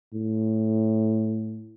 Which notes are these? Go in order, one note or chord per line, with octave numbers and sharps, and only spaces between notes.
A2